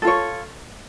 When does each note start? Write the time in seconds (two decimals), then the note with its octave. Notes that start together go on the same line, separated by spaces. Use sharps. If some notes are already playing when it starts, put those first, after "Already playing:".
0.02 A4
0.05 F4
0.07 C#5